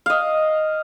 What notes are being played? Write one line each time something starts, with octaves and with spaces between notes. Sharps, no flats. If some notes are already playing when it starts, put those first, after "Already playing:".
D#5 F5